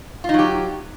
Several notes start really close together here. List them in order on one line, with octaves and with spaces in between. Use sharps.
F4 D#4 F#3 G4